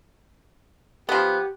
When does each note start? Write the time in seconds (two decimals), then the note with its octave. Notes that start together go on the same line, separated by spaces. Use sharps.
1.09 F3 B3 G4